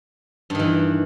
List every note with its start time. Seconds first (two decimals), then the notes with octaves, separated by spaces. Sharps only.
0.50 G2
0.55 D#3
0.59 E3